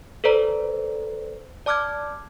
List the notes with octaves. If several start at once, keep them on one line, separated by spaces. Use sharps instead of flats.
A4 B4 C5 D5 A#5
D5 A5 D6 F6 F#6 G#6